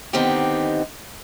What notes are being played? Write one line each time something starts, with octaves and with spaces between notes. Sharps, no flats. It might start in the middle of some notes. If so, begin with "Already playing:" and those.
D3 D#3 B3 C4 D#4 G4